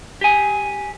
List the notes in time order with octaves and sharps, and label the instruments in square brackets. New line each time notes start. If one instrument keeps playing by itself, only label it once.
[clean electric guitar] G4 G#5